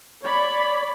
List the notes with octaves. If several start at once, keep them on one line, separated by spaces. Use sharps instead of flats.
C#5 D5 B5